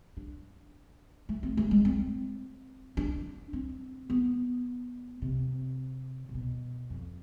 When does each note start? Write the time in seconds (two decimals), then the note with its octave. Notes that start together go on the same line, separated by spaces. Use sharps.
0.17 D4
1.29 A3
1.43 C4
1.57 A3
1.71 G#3
1.85 C4
2.97 D4
3.53 C4
4.10 B3
5.22 C3
6.29 C3
6.34 B2
6.90 F2